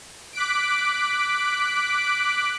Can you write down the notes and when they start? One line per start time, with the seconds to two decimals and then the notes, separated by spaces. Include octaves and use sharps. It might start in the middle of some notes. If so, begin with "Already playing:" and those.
0.33 D6 F#6 B6 D7